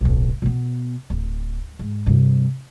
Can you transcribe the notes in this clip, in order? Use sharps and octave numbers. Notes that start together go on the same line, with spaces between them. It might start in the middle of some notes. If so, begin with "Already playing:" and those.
D1 B1
B2 B3
D1
G#2
G2 C3